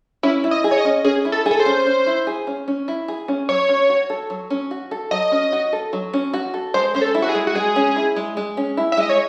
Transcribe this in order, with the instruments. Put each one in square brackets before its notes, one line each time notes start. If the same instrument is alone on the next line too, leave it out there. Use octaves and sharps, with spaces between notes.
[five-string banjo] C#4 [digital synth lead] E4
[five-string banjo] E4
[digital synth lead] D#5
[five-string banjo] G#4
[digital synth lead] C#5
D#5
[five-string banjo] C#4
[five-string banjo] C#4 [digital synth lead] G#4
[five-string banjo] E4
[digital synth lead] A4
[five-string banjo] G#4
[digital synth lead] A4
C5
[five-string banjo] C#4
C#4
E4
G#4
C#4
C#4
E4
G#4
C#4
[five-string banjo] F#3 [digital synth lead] C#5
[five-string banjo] C#4
F#4
A4
F#3
C#4
F#4
A4
[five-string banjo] F#3 [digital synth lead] D#5
[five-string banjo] C#4
F#4
A4
F#3
C#4
F#4
A4
[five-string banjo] G#3 [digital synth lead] C5
[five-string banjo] C#4 [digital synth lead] C5
[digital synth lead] A4
[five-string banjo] E4
[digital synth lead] F#4
G#4
[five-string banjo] G#3
[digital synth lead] F#4
[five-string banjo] G#3 [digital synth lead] G#4
[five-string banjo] C#4
E4
G#3
G#3
C#4
E4
[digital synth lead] E5
[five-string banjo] G#3 [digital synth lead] D#5
[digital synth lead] C#5